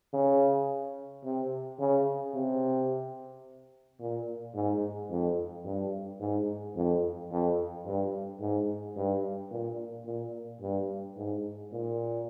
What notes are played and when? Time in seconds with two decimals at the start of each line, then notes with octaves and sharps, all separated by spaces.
0.14 C#3
1.24 C3
1.79 C#3
2.34 C3
4.00 A#2
4.54 G#2
5.10 F2
5.65 G2
6.20 G#2
6.76 F2
7.31 F2
7.85 G2
8.40 G#2
8.96 G2
9.51 A#2
10.06 A#2
10.61 G2
11.17 G#2
11.72 A#2